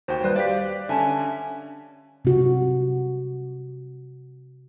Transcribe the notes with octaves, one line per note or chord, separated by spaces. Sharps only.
D#2 F#4 C5 G5
G3 B4 C5 F#6
G4 D5 F5 B6
D3 C#4 E5 G#5 A5
C3 F#4